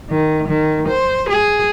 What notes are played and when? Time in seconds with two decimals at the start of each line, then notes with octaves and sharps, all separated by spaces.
0.10 D#3
0.48 D#3
0.88 C5
1.30 G#4